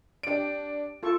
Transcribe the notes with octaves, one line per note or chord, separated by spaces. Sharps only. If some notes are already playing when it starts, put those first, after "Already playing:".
D4 G4 D5 D7
F4 A4 C#6